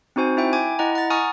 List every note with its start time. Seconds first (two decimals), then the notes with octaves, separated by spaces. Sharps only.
0.16 C4 D#4 F#4 C5 G#5
0.37 E4 E5 G5
0.53 G5 G#5 D6 G#6
0.79 E4 D#5 F#5 A#5
0.95 F#5 A6
1.10 G#5 A#5 C#6 D#6 F6